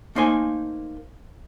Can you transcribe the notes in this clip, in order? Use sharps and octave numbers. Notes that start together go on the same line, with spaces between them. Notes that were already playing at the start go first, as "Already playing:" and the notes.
A3 A#3 D#4 C5 G#5